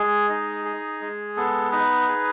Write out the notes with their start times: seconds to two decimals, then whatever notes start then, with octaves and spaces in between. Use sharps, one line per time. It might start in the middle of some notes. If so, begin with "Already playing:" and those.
Already playing: G#3 G#4
0.30 D#4
0.65 G#4
1.01 G#3
1.37 B3 A4
1.72 D#4 B4
2.08 G#4